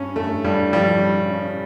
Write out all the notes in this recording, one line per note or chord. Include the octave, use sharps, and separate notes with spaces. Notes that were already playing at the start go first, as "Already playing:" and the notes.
Already playing: G2 C#4
G2 A3
G2 G3
F3 G3
C#4
C#4